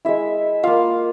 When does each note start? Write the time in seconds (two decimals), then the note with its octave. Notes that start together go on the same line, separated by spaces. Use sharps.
0.05 G#3 E4 E5
0.64 A#3 F4 F5